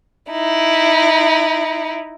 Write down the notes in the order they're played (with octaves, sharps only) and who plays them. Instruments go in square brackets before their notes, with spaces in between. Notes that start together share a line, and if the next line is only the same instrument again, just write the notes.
[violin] D#4 E4